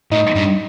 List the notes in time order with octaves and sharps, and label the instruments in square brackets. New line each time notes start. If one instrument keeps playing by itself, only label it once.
[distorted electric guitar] A2 [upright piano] D#4
[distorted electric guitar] G2